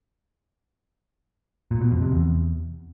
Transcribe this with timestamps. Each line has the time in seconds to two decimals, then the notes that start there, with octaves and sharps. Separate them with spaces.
1.71 A#2
1.81 B2
1.92 F2
2.02 C3
2.12 E2